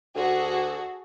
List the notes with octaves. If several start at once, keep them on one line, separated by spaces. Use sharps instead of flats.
D2 F#4 G#4 A4